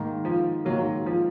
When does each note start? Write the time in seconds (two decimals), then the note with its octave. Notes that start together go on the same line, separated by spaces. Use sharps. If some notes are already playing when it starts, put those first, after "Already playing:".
Already playing: G#2 D#3 A#3
0.25 F3
0.65 G#2 D#3 F#3 A#3
1.06 F3